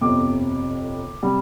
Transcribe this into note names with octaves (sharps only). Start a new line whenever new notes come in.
G1 F2 C3 D6
C3 G3